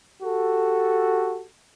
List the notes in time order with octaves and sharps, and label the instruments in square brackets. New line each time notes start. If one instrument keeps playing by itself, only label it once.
[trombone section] F#4 G4 A4